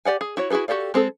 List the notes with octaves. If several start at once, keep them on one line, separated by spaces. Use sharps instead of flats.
G4 D5 F#5 G#5
G#4
E4 F#4 C#5
E4 F#4 G#4 A4 B4
F#4 G4 A4 D5 F5
G#3 C4 G#4 A4